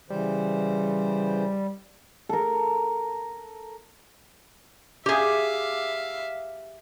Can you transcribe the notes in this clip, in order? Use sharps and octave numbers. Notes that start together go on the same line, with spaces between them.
C#3 E3 G3 C5
A4 A#4
G4 G#4 E5 F5